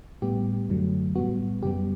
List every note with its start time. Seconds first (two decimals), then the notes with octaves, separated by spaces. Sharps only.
0.22 A2 G3 B3 G4
0.69 F#2 D3 F#3 A3
1.16 A2 G3 B3 F#4
1.63 F#2 C#3 G3 B3 G4